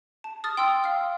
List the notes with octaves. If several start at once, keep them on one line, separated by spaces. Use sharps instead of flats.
A5
D#6 F6 A6
G5 C6 D#6 E6
F5 F6